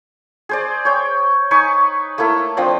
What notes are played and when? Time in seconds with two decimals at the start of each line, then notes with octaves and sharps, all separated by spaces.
0.49 G#4 C5 D5
0.85 C#5 G5
1.51 D#4 B4 G#5 C#6
2.18 A3 A#3 E4 A4
2.57 F3 C4 D4 D#5